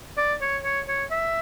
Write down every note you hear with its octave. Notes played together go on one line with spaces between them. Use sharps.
D5
C#5
C#5
C#5
E5